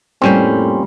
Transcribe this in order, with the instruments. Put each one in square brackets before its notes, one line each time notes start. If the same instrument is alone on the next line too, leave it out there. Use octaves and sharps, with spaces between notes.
[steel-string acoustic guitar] F2 G3 A#3 [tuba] A2 [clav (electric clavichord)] C4 C#4 C5